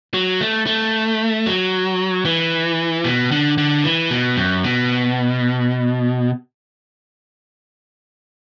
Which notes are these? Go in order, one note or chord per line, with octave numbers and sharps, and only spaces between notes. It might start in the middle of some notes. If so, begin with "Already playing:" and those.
F#3
A3
A3
F#3
E3
B2
D3
D3
E3
B2
F#2
B2